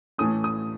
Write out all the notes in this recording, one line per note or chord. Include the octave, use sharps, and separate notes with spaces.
A2 E3 A3 C#4 D#6
D#6